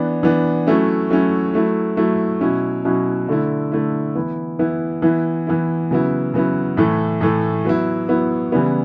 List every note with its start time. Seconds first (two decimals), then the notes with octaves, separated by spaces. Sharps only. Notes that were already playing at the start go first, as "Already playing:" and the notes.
Already playing: E3 B3 D4
0.23 E3 B3 D4
0.67 F#3 A3 C#4 E4
1.10 F#3 A3 C#4 E4
1.54 F#3 A3 E4
1.97 F#3 A3 E4
2.41 B2 F#3 C#4 E4
2.85 B2 F#3 C#4 E4
3.29 D3 A3 E4
3.72 D3 A3 E4
4.15 E3 B3 E4
4.59 E3 B3 E4
5.02 E3 B3 E4
5.47 E3 B3 E4
5.91 C#3 F#3 B3 E4
6.34 C#3 F#3 B3 E4
6.77 A2 E3 A3
7.21 A2 E3 A3
7.65 F#3 B3 E4
8.09 F#3 B3 E4
8.52 C#3 E3 G3 B3 E4